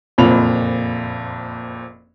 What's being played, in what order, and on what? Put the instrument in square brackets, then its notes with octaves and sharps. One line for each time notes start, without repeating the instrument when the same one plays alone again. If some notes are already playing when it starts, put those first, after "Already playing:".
[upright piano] F#1 F2 A#2 C4 B5 F7